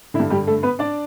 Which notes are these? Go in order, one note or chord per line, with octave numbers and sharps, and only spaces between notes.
D3 E4
G2
G3 G4
A3 A4
B3 B4
D4 D5